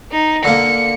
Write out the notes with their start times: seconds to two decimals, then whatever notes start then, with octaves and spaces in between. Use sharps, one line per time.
0.12 D#4
0.44 D3 A#3 C#7